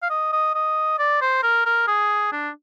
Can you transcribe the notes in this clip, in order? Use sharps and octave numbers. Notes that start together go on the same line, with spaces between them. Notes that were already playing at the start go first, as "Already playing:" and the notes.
F5
D#5
D#5
D#5
D5
C5
A#4
A#4
G#4
D4